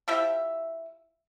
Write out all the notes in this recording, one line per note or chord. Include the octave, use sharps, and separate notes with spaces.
F3 E4 G4 E5